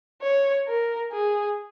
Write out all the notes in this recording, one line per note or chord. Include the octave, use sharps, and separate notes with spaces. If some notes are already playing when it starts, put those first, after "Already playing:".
C#5
A#4
G#4